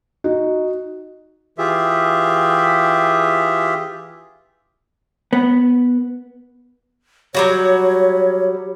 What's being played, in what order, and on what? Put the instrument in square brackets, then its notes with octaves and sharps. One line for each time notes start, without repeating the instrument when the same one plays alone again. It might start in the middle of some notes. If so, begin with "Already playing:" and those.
[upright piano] D#4 [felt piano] F#4
[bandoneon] E3 F4 G4 G#4 E5
[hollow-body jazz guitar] B3
[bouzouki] F#3 G3 F#4 [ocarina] C#5